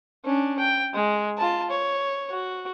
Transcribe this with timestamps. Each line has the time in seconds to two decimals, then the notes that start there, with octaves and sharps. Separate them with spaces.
0.25 C#4 D4
0.59 G5
0.93 G#3
1.38 F4 A5
1.71 C#5
2.30 F#4